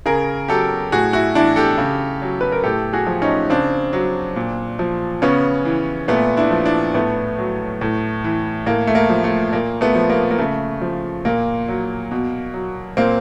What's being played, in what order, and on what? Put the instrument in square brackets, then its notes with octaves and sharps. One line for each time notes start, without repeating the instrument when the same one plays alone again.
[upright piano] C#3 G#4 A#4
F#3 G4 A4
A2 F#4 G#4
E4 F#4
E3 D4 E4
G4 A4
C#3
F#3
B4
A#4
A2 G4 A4
F#4 G#4
F3
C#4 D#4
C#3 C4 D4
F#3
A#2
F3
C#3 B3 C#4
E3
A#2 A3 B3
D4 E4
F3
D4 E4
A2 A3 B3
F#3
A2
E3
A2 A#3
A3
A#3
F3
A3
A#2 A#3
A3 B3
F3
A#3
A#3
C#3 A3
F3
A#2 A#3
F#3
B2
F#3
A#2 A#3 C4